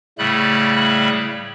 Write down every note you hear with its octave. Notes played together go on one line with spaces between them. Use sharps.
A2 C#3 G3 A3 B5 F#6